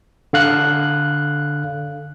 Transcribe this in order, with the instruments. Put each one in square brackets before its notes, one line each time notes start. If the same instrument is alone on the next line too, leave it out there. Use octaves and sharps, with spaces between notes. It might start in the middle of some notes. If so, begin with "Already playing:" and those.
[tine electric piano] D3 F5 F#6